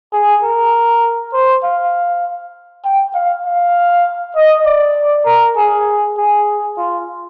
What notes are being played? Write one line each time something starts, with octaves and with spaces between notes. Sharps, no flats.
G#4
A#4
C5
F5
G5
F5
F5
D#5
D5
A#4
G#4
G#4
F4